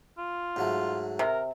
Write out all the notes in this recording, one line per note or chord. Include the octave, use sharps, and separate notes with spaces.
F4
G#2 F#3 A3
C3 A#4